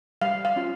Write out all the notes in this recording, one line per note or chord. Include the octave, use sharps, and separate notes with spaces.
G3 F5
F5
C#4 F4